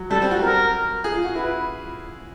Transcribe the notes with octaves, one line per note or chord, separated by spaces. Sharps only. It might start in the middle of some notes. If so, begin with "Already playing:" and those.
Already playing: F#3
G3 A4
C4
F#4
A#4
G#4
F4
F#4
E4 B4